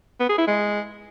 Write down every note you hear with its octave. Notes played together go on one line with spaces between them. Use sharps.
B3
G#4
E4
G#3